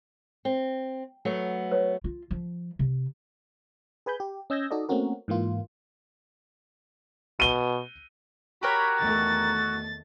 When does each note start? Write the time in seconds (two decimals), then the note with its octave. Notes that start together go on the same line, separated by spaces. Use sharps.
0.45 C4
1.25 F#3 A3 B3
1.71 B4 C#5
2.04 F4
2.31 F3
2.79 C3
4.06 G#4 B4 G#5 B5 G6
4.20 G4
4.50 C#4 D#5 E6 G6 G#6 A#6
4.71 D#4 F#4 A4 D5 D#5
4.89 A3 A#3 C4 C#4 F#4 A#4
5.28 G#2 E3 A#3 F4
7.40 B2 D#7 G7
8.63 F#4 G4 A#4 C#5 B5
8.98 E2 D#3 A3 A6